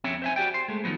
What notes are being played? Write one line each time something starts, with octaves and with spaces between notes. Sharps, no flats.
F2 C4 C#4 C#5 E5
C5 E5 G#5
F#4 G4 D5 G5
C5
G#3 A3
D#3 F3 F#3 B3